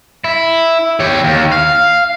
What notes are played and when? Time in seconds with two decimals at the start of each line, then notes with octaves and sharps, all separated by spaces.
0.24 E4
1.00 G4 C#5
1.24 D#2
1.51 F5